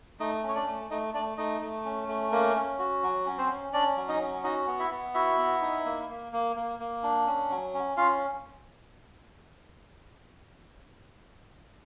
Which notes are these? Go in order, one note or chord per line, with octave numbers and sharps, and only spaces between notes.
A3 D#4 D#5
C#4
C#5
D4 D5
A3
A3 D#4 D#5
A3 D4 D5
A3 D#4 D#5
A3
C#4
A3
A#3 C#4 A#4
C#4
F#4
F#3
C#4
C4 C5
C#4
C#4 D4 D5
F#3
D#4 D#5
C#4
D#4 F#4 D#5
B3
E4 E5
B3
E4 F#4 E5
B3
D#4
A#3
A#3
A#3
A#3
A#3
D4
C#4
F#3
C#4
C#4 F4 F5